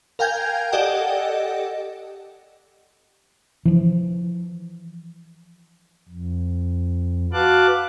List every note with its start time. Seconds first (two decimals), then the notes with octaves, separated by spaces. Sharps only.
0.19 A#4 F5 G5 G#5 G6 G#6
0.72 G4 A4 D5 D#5 F#5 G5
3.65 E3 F3
6.09 F2
7.33 F#4 B4 F5 A5 D6 F#6